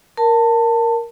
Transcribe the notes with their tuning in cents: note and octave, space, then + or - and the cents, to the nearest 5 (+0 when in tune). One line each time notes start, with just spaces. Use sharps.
A#4 +0 A5 +20